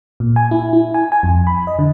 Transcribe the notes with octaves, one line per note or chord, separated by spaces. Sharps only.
A#2
G#5
E4
E4
G#5
G#5
F2
B5
D#5
D3